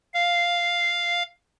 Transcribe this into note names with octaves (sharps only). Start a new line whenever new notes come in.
F5